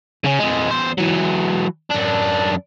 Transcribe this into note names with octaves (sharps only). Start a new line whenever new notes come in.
C#3 C#4
F2 G#3
E2 C5
E3 F#3
F#2 D4